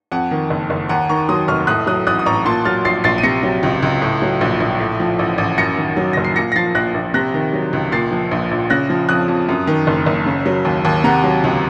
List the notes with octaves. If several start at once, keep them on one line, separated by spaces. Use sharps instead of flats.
F2 F#5
D#3
F#1
F#1
D#2 F#5 A#5
D#3 A#5 C#6
F#3 C6 D#6
F1 C#6 F6
A2 D#6 F#6
F#3 D#6 F#6
A1 D#6 F#6
D#6
A1 A#5 C#6
A#2 A5 C6
F#3 F6 A6
A#1 A6 C7
A#1 A6 C7
D#7
C3 A#6 C#7
F#3
C#2
C#2
A2
F#3
A#1
A#1
A2
F3
A1
A1
F#2 A#6 C#7
D#3
F#3
F#1 A#6
C7
A#2 A#6 C#7
A#6
F3 A6 C7
A#1 F#6 A#6
A#1
C3 F#6 A#6
D#3
F#3
C#2
A#2 A6 C7
F3
A#1
A#1
C#3 F#6 A#6
F3
F2 D#6 F#6
F2
F#2
D#3
F#1
F#1
C#3
F#3
D#2
D#2
C3 F#5 A#5
F#3
C#2